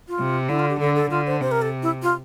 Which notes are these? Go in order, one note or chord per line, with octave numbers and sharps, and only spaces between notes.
F4
C3
D3 E4
F4
G4
D3 A4
A4
D3 F4
C5
C3 C5
A#4
A4
E4
F4